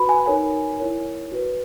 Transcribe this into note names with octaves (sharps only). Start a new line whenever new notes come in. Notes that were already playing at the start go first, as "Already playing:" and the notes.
Already playing: F#4 B4 B5
G#5
D#4 A#4 C#5 G#5
E4 A#4 C#5
F#4 B4